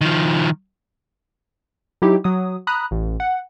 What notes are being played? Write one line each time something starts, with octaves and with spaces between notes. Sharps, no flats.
D#3 F3
F#3 D#4 E4 G4
F#3 D#6
A#5 B5 D#6 F#6
A1
F#5